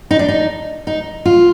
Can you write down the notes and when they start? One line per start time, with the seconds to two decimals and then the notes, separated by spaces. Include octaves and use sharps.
0.11 D#4
0.19 D4
0.28 D#4
0.87 D#4
1.25 F4